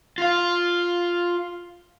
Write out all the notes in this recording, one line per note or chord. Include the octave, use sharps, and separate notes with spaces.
F4 F5